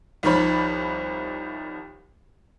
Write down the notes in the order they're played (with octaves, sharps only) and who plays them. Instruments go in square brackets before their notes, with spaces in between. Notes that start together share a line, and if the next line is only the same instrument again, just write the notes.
[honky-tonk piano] C2 D#3 F3 C#5 B5